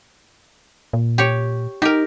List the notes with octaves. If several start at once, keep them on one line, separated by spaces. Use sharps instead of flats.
A#2
G4 C#5
D#4 G4 A#4